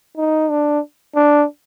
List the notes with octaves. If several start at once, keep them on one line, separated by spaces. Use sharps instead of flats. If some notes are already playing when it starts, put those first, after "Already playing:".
D#4
D4
D4